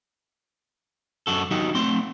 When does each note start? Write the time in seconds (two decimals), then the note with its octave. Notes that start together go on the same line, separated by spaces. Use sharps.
1.27 F#2 F#4 A4
1.51 F#3 D#4 F#4 G4
1.75 A3 C4 C6